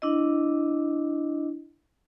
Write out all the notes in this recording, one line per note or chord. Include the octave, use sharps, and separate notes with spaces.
D4 E4 D#5